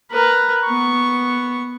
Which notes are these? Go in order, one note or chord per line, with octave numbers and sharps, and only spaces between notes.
A#4 B4
B3 C#6